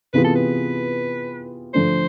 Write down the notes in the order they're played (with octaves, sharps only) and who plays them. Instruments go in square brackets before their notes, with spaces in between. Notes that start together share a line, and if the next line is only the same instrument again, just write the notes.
[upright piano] C3 E3 B3 F4 G#4 [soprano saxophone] B4
[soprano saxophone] A4
B4
[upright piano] D3 F3 A3 D4 [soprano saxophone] C5